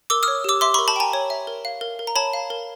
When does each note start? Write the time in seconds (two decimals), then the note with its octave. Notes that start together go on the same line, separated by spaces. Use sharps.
0.10 A#4 D6 E6
0.23 D#6 F6
0.28 C#5
0.44 G4 D6 E6
0.61 E5 C6 D6
0.74 B5 C#6
0.79 A#4
0.88 A5 B5
0.96 G5 G#5 A#5
1.13 C#5
1.30 E5
1.47 A#4
1.65 F5
1.81 A#4
1.99 A#4
2.07 A#5
2.15 C#5 A5 B5
2.33 F5
2.50 A#4